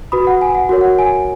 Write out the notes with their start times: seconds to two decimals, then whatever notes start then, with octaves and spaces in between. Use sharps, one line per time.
0.12 F#4 B4 B5 D#6
0.27 F#5
0.41 G#5
0.55 F#5
0.69 F#4 A#4 C#5
0.81 F#5
0.99 G#5